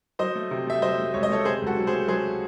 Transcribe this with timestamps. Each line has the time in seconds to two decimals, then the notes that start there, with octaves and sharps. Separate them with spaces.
0.19 F#3 C5 D#5
0.35 A3
0.51 C3
0.67 A3 E5
0.82 F#3 C5 D#5
0.98 A3
1.14 C#2 C#5
1.23 D#5
1.30 A3 A4 C#5
1.45 C3 G#4 C5
1.62 C#2 F#4 A4
1.77 F#3
1.87 G#4 C5
1.93 A3
2.08 F#3 G#4 C5